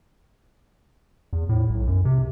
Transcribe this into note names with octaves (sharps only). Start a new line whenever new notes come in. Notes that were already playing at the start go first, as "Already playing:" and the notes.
E2
A2
B1
F#2
C3